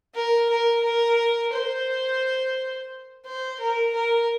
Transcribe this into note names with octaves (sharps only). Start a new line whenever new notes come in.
A#4
A#4
A#4
C5
C5
A#4
A#4